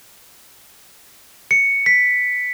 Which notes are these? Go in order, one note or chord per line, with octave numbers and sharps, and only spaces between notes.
C#7
B6